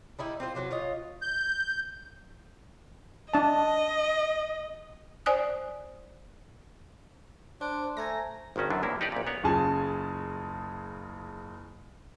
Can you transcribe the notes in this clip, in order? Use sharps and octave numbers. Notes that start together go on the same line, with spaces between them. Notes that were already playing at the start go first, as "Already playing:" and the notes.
G3 D#4 E4
C4 F4 C5
C3 F#3 F#4 B4
F4 C#5 D#5
G6
D4 D#5 A5
C5 D5 G#5 D#6 F#6
D4 C5
A3 G#5 A#5 A#6
G#1 G2 D#3 C#4 F#4
F#2 D3 F#3 B3 D4
B1 E2 A2 A#3 E4
D#4 G4 B4 D5
A#1 A#2
B3 A#4 C#5 F#5
F#1 C#3 F4 G#4 G#5 A5